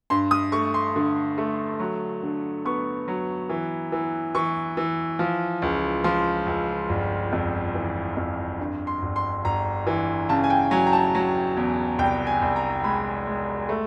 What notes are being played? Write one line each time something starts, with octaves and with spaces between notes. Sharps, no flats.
G2 C6
D#6
A3 C#6
C6
D3
A3
F#3
D3
B3 C#6
F#3
E3
E3
E3 C#6
E3
F3
C#2
F3 C6
C#2
G1
F2
E3
F2
G2
C6
G1
C6
G1 A#5
E3
C#3 A5
G#5
G5
F#3 G#5
A#5
A5
F#3
E2
C2 G5
G#5
C2
A#5
G#3 B5
G#3
A3